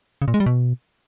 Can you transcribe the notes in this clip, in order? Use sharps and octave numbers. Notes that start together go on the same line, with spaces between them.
C#3
A#2
G#3
G3
B2